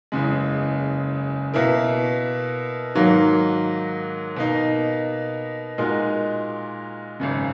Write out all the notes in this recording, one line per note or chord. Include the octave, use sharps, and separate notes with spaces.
F#1 E2 C#3 G#3
B2 A#3 E4 A#4
G#2 D#3 F#3 A#3
B2 A#3 D#4
A#2 G#3 D#4 F#4 A#4
G#1 F#2 C#3